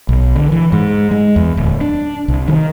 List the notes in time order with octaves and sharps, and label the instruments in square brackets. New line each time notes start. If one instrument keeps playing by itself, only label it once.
[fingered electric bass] B1
D3
E3
G#2
G#3
E2
D1
D4
C2
D#3